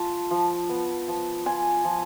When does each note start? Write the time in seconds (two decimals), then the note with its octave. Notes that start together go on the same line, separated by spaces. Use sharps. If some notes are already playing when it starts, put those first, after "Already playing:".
Already playing: F3 F4 A5
0.31 F3
0.69 B3
1.08 F3
1.46 F4 G#5
1.85 F3